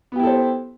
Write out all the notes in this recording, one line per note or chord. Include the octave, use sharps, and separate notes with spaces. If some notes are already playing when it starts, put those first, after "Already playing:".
B3 E4 G4 A4 C5